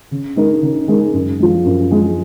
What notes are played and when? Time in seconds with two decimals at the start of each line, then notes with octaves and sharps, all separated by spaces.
0.11 C#3
0.36 G#3 D#4 A#4
0.62 C#3
0.88 G#3 D#4 A#4
1.13 F#2
1.39 F3 G#3
1.65 F#2
1.91 F3 G#3